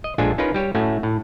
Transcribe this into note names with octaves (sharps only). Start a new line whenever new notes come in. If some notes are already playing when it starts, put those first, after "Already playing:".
D#5
A#1 G#3 D4 F4 A4 G#5
C#4 D#4 F4 A#4 B4
G3 G4 C#5
A2 A3 C#4 F#4
A2